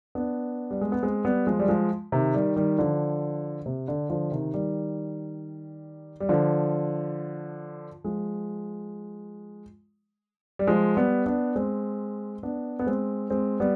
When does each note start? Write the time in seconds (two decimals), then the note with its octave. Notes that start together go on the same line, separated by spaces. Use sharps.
0.15 B3 D4
0.71 G3
0.81 G#3
0.92 B3
1.03 G#3 C4
1.25 G3 B3
1.47 F3 G#3
1.59 G3
1.68 F3 G#3
2.12 C3 D#3
2.34 D#3 G3
2.56 D#3 G3
2.78 D3 F3
3.66 C3
3.88 D3
4.10 D3 F3
4.31 C3 D#3
4.54 D#3 G3
6.20 G3
6.29 D3 F3
8.04 F3 G#3
10.59 G3
10.67 F3 G#3
10.97 G3 B3
11.26 B3 D4
11.56 G#3 C4
12.43 B3 D4
12.79 B3
12.86 G#3 C4
13.30 G#3 C4
13.60 G3 B3